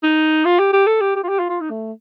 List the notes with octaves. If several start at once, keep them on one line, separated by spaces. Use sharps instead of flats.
D#4
F4
G4
G4
A4
G4
G4
F4
G4
F4
F4
D#4
A3